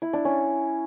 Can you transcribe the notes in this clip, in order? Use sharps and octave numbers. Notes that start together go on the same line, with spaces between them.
E4
D4
C#4